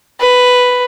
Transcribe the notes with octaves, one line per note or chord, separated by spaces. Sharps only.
B4